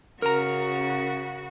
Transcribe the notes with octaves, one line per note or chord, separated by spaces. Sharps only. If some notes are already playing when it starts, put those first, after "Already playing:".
C#3 F#4 A#4 A#5